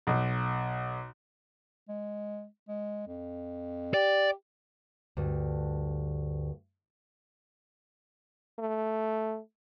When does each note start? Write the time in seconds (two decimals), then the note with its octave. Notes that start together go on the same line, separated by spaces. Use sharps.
0.07 B1
1.88 G#3
2.68 G#3
3.07 F2
3.94 G4 D5
5.17 D2 G2
8.59 A3